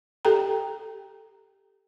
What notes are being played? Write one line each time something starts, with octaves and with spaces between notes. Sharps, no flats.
G4 A4 G5 A#5